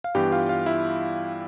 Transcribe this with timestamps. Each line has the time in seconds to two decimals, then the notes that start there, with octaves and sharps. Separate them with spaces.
0.04 F5
0.15 G2 E3 G3 B3 G4 G5
0.32 F4 F5
0.49 F4 F5
0.66 E4 E5